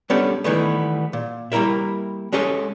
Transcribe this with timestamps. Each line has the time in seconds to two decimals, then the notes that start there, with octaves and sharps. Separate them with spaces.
0.10 G3 B3 C#4 D4 G4 A4
0.44 D#3 E3 G3 A3 B3
1.13 A#2
1.52 G3 A#3 E4 A#4 E5
2.32 G#3 C#4 G4 A4 D#5